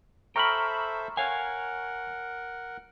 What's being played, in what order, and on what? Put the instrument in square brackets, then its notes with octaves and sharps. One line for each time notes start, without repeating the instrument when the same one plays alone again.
[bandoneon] A4 C5 E5 [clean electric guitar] G5 B5 [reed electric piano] A#5 C#6 F6
[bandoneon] A#4 F#5 [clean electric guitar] C#5 F5 G#5